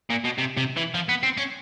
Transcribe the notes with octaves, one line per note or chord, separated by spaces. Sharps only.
A#2
B2
C3
C3
E3
F3
B3
C4
C#4